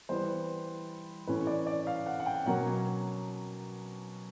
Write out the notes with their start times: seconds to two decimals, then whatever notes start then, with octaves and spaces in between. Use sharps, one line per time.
0.09 E3 G3 B3 C5
1.27 A2 E3 A3 C#4 B4
1.47 D5
1.67 D5
1.87 F5
2.06 F#5
2.20 F#5
2.26 G5
2.46 B2 F#3 A#3 C#4 F#5